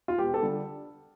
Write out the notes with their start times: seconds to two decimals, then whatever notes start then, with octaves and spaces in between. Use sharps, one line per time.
0.08 F4
0.18 E1 G4
0.34 A4
0.42 D3 G3